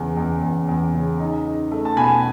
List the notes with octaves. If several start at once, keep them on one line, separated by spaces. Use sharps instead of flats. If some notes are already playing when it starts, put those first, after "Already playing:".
Already playing: E2 C#3
E2
E2
E2
C#3
D#4
D#4
A3
A5
B2 G#5 B5